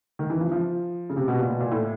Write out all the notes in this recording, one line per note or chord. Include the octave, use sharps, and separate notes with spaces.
D#3
E3
F3
F3
C#3
C3
B2
A#2
B2
A#2
A2